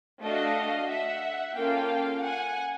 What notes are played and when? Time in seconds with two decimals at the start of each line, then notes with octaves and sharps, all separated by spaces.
0.22 A3 D4 F#4 A4 D#5 F5
0.89 E5 F#5
1.56 A#3 C#4 F4 A4 F5 G5
2.23 F#5 G#5